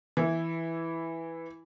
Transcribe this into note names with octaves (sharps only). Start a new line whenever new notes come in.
E3 E4